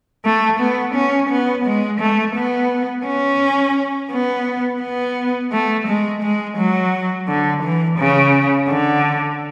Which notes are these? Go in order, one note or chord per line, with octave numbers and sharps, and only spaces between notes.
A3
B3
C#4
B3
G#3
A3
B3
C#4
B3
B3
A3
G#3
G#3
F#3
D3
E3
C#3
D3